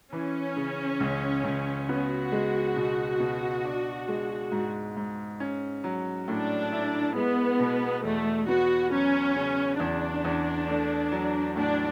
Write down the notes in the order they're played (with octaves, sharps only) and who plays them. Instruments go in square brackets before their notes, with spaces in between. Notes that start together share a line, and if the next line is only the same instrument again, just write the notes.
[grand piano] E3 [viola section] C#4
[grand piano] C#3
C#2
C#2
[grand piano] B3 [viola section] F#4
[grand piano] G#3
B2
B2
D4
G#3
G#2
G#2
C#4
F#3
[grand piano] A2 [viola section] D4
[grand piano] E4
[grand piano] G#3 [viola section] B3
[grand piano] B2
[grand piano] E2 [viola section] A3
[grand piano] B3 [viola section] F#4
[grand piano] F#3 [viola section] C#4
[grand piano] C#3
[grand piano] E2 [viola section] D4
[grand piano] E2
A3
F#3
[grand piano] A2 [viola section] D4